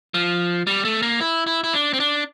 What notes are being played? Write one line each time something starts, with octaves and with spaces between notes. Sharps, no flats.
F3
G3
A3
A#3
E4
E4
E4
D4
C4
D4